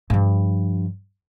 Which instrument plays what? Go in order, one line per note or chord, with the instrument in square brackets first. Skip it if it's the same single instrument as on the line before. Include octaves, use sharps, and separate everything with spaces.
[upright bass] G2 F3